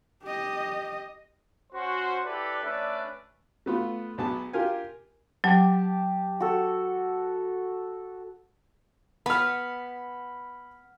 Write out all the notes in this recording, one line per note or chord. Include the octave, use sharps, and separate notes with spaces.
G4 D#5
C#4 F#4 C5
E4 G4 A4 B4 D5
A3 C#4 D4 B4 D5 E5
A3 B3 F4
B1 B3 G#4 A5
F4 G4 A#4 F5 G#5
F#3 G4 A5
F#4 A4
B3 B5 F6